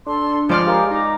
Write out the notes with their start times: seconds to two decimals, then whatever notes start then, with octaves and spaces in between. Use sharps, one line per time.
0.06 D4 A4 C6
0.49 F3 G#3 D5 B5 C6 F6
0.67 G4 G#4 A#4 F5
0.91 D#4 A#5 D6